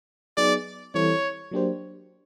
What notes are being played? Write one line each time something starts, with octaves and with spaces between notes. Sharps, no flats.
F#3 B3 D#4 G#4 D5
E3 G3 C4 E4 A4 C#5
F#3 A#3 D4 G4 C5